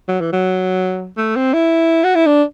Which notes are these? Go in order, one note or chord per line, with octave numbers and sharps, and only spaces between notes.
F#3
E3
F#3
A3
C4
E4
F#4
E4
D4